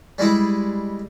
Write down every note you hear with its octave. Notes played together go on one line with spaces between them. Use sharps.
G3 G#3 E4 G#4